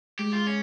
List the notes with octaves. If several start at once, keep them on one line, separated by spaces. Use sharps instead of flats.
G#3 G4
F4
C#4